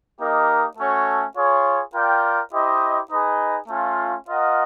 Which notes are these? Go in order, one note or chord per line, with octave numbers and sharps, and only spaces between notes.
A#3 D#4 G4 A#4 D#5
A3 C#4 F#4 A4 C#5
F4 G#4 C#5
F4 A#4 D5 G5
E4 G4 C5 D#5
D#4 G#4 B4 D#5
A3 C#4 F4
F4 A#4 D#5 F#5